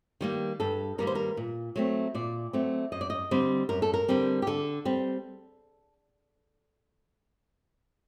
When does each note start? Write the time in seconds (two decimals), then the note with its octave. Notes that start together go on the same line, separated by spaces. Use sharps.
0.21 D#3 G3 A#3
0.60 G2 A4
0.98 D#3 G3 A#3 A#4
1.07 C5
1.15 A#4
1.37 A#2
1.76 F#3 A3 C4
2.15 A#2 D5
2.53 F#3 A3 C4
2.92 F#2 D#5
3.01 D5
3.10 D#5
3.31 D3 G3 C4
3.69 F#2 A#4
3.82 A4
3.94 A#4
4.08 D3 G3 C4
4.42 G4
4.47 D3 A4
4.85 G3 C4